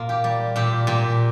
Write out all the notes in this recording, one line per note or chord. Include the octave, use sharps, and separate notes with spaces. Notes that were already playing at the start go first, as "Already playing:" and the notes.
Already playing: A#2 A#3 F4
G4
G3
A#2 G4
A#2 G4